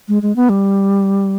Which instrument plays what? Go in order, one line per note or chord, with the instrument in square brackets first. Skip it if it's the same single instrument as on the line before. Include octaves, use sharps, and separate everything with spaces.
[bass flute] G#3
G#3
B3
G3